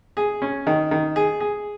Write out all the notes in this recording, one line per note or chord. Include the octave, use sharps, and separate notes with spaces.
G#4
C#4
D#3
D#3
G#4
G#4